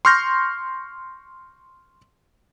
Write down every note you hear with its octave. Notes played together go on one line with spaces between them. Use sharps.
C6 C#6 F6 G6 A#6